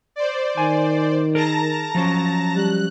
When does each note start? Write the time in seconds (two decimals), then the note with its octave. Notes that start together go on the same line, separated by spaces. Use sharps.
0.16 C5 D5
0.58 D#3 G#5
1.35 G#4 A#4 A5 A#5 A#6
1.95 F3 F#3 C#4
2.56 G3 F#6